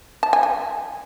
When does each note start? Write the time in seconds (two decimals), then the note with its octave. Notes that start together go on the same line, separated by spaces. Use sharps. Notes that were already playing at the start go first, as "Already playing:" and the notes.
0.23 A5
0.33 G#5
0.43 G#5